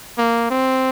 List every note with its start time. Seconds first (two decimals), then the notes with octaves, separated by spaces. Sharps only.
0.18 A#3
0.51 C4